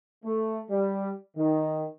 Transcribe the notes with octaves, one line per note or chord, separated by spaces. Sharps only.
A3
G3
D#3